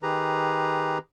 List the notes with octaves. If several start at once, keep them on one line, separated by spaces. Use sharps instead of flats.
D#3 G4 G#4 B4 A#5